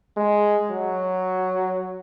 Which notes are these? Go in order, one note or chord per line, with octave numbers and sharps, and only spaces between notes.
G#3
F#3